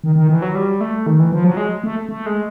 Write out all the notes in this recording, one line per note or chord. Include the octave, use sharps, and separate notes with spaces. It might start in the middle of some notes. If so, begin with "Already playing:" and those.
D#3
D#3
E3
F#3
G3
A3
D#3
E3
F3
F#3
G#3
A3
A3
G#3